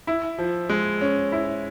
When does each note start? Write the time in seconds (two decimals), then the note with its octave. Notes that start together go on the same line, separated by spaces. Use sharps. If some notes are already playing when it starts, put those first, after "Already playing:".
0.07 E4
0.38 F3
0.69 G#3
1.01 C#4
1.32 E4